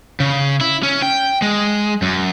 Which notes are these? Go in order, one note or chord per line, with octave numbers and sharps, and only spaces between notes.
C#3
E4
C#4
G5
G#3
F#2